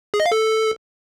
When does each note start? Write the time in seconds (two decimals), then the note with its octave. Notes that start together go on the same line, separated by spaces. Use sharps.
0.14 G#4
0.20 D#5
0.26 F5
0.32 A4